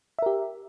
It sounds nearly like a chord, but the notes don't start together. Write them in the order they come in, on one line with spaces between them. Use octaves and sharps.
E5 A#4 G4